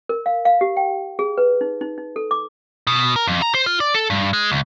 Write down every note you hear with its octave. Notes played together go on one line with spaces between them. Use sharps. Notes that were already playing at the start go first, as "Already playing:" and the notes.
A#4
F5
F5
G4
G5
G#4
B4
D#4
D#4
D#4
A4
D6
B2
A#4
F2
A#5
C5
F4
D5
A4
G2
G#3
C#2